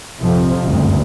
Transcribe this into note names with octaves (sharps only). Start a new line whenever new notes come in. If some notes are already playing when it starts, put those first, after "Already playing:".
A#1 F2 C3 F3
F#1 D2 G2